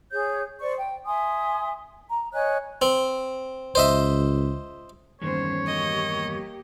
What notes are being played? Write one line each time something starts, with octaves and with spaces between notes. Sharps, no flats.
G#4 C#5 G6
C5 D5 C#6
G5
E5 G#5 C6 D#6
A#5
C#5 D#5 G#5 F#6
C4
C#2 C5 D#5 E5
E2 G2 D#3 A#3 C#4 C5 C#5
A#3 G4 D#5